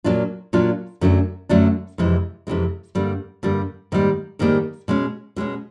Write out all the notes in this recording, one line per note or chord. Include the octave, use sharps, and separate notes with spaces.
A#2 F#3 A#3 D4 F4
A#2 F#3 A#3 D4 F4
F#2 D3 F#3 A3 D4
F#2 D3 F#3 A3 D4
F2 C3 E3 G#3
F2 C3 E3 G#3
G2 D3 G3 A#3
G2 D3 G3 A#3
G#2 D#3 G3 A#3
G#2 D#3 G3 A#3
B2 G#3 C#4
B2 G#3 C#4